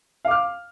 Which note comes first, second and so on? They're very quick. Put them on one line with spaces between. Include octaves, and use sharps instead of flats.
F5 D6 F6